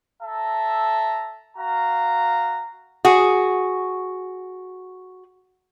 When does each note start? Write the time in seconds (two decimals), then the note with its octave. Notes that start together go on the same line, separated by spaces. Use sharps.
0.23 A4 E5 A5 A#5
1.57 F#4 F5 A#5
3.05 F#4 G#4